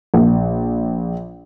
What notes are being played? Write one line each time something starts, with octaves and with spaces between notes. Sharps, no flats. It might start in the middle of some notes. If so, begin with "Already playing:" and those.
A#1